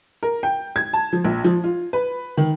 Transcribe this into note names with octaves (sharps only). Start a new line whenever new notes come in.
A#4
G5
G#6
A5
F3
A#1
F3
F4
B4
D#3